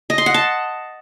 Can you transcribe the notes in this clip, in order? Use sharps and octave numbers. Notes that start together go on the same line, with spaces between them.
D#5
C6
F#5
A5